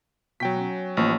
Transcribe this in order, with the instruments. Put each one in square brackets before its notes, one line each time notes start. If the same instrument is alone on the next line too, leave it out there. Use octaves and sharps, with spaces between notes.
[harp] B2 [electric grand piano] F#3 G5 B6
[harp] C#4
[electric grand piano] A1 F3 [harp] A#3 C#6